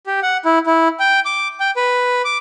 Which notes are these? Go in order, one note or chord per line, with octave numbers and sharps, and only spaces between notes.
G4
F#5
E4
E4
G5
D6
G5
B4
D6